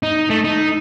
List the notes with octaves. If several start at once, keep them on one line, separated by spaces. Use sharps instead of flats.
D#4
A3
D#4